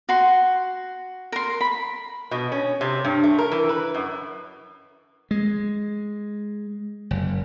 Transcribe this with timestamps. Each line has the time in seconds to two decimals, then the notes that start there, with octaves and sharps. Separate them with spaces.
0.09 F#4 C6
1.32 A#4 C6
1.61 B5
2.31 B2
2.52 C#4
2.81 C3
3.05 G2
3.24 A3
3.38 A#4
3.52 E3
3.69 B4
3.94 F#2
5.31 G#3
7.11 F#1